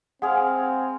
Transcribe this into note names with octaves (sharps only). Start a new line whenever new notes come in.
G#3 C4 G#4 F5 F#5